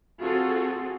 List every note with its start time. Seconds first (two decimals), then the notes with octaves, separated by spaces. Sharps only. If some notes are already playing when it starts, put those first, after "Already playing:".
0.22 C4 F4 F#4 G#4 A4